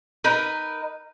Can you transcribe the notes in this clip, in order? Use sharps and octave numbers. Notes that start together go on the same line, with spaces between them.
D#4 A#4 B4